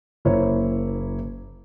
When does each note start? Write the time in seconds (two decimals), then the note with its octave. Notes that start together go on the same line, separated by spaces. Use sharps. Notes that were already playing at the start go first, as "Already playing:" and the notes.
0.25 F#1 A#3 E4 C5 C#5